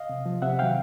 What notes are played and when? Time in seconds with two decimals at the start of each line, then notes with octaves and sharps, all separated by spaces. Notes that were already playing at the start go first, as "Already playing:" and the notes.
Already playing: D#5 F5
0.09 C3
0.26 F3
0.42 C3 E5 F#5
0.59 D#3 F#3 F5 G5